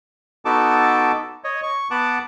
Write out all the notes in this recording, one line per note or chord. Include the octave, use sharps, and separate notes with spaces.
B3 D#4 F#4 A4 A5 D6
C#5 D#5
C#6
B3 F#5 A5 D6